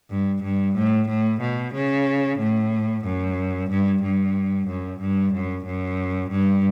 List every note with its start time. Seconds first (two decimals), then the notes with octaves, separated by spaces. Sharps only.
0.10 G2
0.43 G2
0.76 A2
1.08 A2
1.41 B2
1.74 C#3
2.39 A2
3.05 F#2
3.70 G2
4.02 G2
4.68 F#2
5.00 G2
5.33 F#2
5.66 F#2
6.30 G2